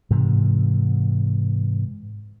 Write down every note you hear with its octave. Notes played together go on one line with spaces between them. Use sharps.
G#2 C3 E3